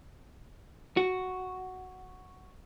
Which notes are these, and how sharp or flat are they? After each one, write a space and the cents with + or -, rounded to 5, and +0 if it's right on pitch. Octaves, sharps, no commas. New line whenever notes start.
F#4 +0